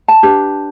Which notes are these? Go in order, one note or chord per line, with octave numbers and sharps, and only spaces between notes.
A5
D4 G4 B4